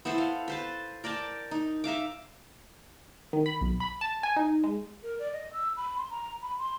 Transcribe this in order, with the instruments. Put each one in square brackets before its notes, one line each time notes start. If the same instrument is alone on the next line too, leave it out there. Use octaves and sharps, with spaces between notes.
[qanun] B3 E4 A4 C5
F5
B4 C5 A5
A#4 D5 G5 A5
D#4
D#4 E5 F5 D6
[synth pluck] D#3
B5
B1
B5
A5
G#5
D#4
G#3
[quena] A#4
D5
D#5
E6
B5
C6
A#5
B5
C6